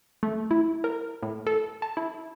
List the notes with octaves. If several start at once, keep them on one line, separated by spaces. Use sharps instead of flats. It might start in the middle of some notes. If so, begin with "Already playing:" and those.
A3
E4
A#4
A2
A4
A5
E4